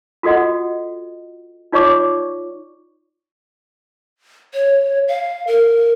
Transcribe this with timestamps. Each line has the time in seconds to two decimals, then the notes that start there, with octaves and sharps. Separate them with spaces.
0.23 F4 F#4 A4 D#5 F#5
1.72 D#4 F4 C#5 D5 C#6 D6
4.54 C#5
5.08 F5
5.47 A#4